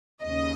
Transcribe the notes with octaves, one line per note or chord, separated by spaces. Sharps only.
D#2 C#3 D#5